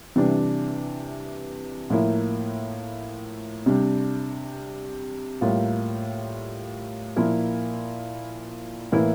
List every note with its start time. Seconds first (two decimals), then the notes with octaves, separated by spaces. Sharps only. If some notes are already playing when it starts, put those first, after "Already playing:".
0.16 C3 E3 G3 D4
1.90 A2 F3 A#3 E4
3.66 C3 G3 D4
5.41 A2 G3 A#3 F4
7.16 A#2 F3 A#3 E4
8.92 A2 E3 A#3 E4